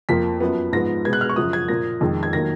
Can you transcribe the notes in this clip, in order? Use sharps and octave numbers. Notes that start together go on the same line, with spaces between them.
F2 F3 A#3 B6
F#2 F3 B3
G#2 F3 B3 A#6
B2 G#3 B3 G#6
F#6
F6
C#6
F#2 C#3 F3 D#6
G#6
A#2 F3 A#3 A#6
F2 D#3 G#3
G#6
D#3 F#3 A#3 A#6